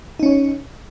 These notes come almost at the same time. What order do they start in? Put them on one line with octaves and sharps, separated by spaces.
D#4 C#4 C#5